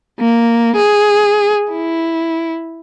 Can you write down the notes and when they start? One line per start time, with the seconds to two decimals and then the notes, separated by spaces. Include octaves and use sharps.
0.20 A#3
0.76 G#4
1.72 E4